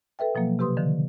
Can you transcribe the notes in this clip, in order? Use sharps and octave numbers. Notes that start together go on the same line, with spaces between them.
A4 B4 E5 G5
B2 F3 F#3 A#3
C3 G4 B4 C6 D#6
D3 D#3 F3